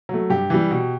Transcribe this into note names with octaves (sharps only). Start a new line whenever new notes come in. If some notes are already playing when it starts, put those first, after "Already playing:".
F#3 A3
G2 G4
E3 G3
B2